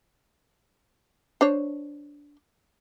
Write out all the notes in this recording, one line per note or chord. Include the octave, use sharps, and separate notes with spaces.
D4 C5 C#5